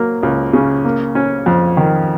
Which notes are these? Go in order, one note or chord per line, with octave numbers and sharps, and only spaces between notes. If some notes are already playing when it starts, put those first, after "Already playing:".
Already playing: F#3 A#3
C#2
C#3
A#3
C#4
F2
D#3